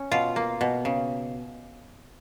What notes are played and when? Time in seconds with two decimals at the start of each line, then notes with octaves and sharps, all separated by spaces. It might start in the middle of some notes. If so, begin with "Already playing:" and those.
Already playing: C#4
0.11 B2 F4
0.36 A#3
0.61 B2
0.85 C#3